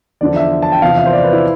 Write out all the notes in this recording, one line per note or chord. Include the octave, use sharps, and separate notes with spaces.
E2 D3 F3 D5
E5
A5
G5
E2 C3 F3 F5
E5
C5
D5
B4
E4